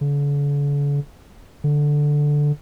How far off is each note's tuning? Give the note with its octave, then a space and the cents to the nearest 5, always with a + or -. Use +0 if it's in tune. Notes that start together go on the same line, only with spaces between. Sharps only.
D3 -45
D3 +0